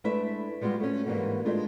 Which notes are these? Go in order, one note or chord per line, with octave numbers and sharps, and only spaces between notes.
G#3 A3 D4 E4 B4 E5
G3 G#3 B3 F4 F#4
A3 C#4
G#2 E3 G3 G#3 A#3 F#4
G#3 A3 D4 F4